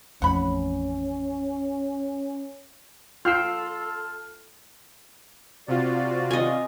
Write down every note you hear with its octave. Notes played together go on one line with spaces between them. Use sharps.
A1 F2 A2 C#4 F#5 B5
F4 A4 G5 C6 E6 F6 C7
C3 F4 F#4 D5
D#5 G#5